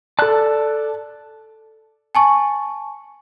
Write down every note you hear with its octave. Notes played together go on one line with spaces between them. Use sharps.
A4 D5 A5 F#6
G#5 A5 C#6